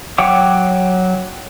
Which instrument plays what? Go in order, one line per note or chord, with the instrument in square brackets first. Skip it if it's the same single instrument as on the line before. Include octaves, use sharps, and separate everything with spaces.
[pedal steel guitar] F#3 C#5 F#5 G5 D6